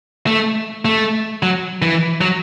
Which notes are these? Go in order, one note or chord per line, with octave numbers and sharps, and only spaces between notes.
A3
A3
F#3
E3
F#3